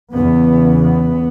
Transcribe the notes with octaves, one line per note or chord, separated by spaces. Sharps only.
E2 C#3 B3
B3